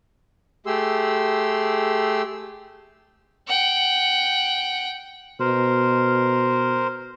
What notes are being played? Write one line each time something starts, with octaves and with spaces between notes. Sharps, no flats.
A3 G4 G#4 C6 E6
F#5 G5
B2 A#4 C5